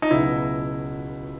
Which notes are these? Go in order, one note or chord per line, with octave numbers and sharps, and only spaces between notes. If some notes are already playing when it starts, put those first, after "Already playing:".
D#4
C#2 B2 F#3 E4